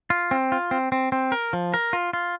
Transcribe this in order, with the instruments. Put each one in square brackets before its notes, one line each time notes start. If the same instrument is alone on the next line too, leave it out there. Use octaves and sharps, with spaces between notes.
[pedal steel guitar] F4
C4
F4
C4
C4
C4
A#4
F3
A#4
F4
F4